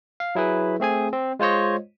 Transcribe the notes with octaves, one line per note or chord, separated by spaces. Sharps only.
F5
F#3 E4 G#4 B4
A3 C4 G#4 G#5
C4
G#3 F4 C5 C#5 D#5